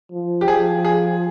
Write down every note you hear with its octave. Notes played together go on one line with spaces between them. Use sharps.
F3
G4
F3 G#4
G#4